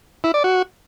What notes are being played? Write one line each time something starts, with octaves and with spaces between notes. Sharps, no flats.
E4
D5
F#4